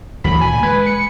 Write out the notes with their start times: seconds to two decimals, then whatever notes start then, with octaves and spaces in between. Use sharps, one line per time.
0.24 D2 E3 F#3 B5
0.41 A#2 G#5
0.63 G#3 B4
0.86 C#7